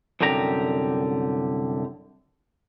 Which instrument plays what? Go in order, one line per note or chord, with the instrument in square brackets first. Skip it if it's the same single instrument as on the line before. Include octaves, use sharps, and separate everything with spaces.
[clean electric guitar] C2 F#2 D3 G4 A#5